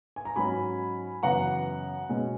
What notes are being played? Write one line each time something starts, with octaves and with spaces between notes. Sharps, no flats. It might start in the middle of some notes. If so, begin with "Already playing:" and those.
G#5
A#5
G#2 F#3 C#4 G#5 B5
F#2 C#3 E3 B3 F#5 A#5
B2 G#3 C#4